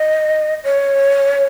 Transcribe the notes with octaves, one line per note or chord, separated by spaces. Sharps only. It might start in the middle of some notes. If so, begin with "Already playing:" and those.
Already playing: D#5
C#5